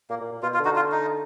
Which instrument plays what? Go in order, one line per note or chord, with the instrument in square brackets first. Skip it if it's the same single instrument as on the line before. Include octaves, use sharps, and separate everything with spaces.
[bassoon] A#2 [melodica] A#3
[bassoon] A#2
A#2
[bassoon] B2 [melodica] F4
[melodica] F4
[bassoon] D3
[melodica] D#4 F#4
F4
D#4